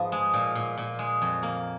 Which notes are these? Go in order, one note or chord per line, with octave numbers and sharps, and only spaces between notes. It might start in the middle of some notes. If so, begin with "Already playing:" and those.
Already playing: G#2 F3 B3
G#3
A#2
A#2
A#2
G#3
F2
A#3